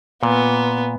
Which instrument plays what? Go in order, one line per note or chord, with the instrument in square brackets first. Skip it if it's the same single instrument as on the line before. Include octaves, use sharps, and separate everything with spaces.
[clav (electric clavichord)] A#2 [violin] B3